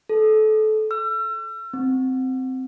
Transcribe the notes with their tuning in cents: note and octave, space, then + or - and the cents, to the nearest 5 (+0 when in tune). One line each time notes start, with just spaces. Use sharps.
A4 -25
E6 +40
C4 -10